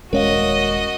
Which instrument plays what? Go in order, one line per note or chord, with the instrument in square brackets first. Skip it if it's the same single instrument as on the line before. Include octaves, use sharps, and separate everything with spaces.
[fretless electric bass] D#1 G#3 C#4 [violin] F#4 D#5 [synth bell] A#4 C#5 F5